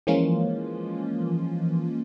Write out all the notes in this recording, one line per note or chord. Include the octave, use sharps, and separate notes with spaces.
E3 F3 G#3 A#3 C#4 F4